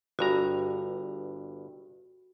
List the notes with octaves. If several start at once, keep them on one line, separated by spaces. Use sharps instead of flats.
G1 G2 F#4 A#5